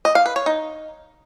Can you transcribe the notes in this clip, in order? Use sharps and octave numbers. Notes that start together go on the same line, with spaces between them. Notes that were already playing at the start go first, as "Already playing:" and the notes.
D#5
F5
B4
C#5
D#4